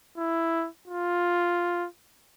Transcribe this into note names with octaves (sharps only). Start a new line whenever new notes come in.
E4
F4